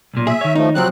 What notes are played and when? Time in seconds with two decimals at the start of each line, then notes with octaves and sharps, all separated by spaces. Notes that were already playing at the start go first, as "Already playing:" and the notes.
0.14 B1 A#2
0.27 G#4 E5
0.41 D#3 C#5
0.55 F3 A3 D#4
0.75 C#2 C3 F3 F#3 C4 F#6